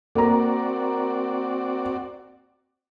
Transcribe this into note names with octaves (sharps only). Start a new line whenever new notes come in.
A#3 C4 F#4 D5 A#5